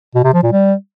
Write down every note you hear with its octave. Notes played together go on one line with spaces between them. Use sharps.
B2
C3
F3
A#2
G3